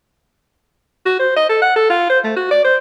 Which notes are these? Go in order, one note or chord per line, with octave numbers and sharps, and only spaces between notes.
F#4
C5
D#5
A4
F#5
A4
F4
C5
A3
F#4
D5
C5